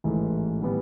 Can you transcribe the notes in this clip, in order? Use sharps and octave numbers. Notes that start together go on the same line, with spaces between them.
A1 G#2 E3 A3
A2 E3 G3 B3